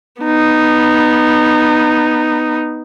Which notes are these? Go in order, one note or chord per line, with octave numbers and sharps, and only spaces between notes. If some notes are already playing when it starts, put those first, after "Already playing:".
B3 D#4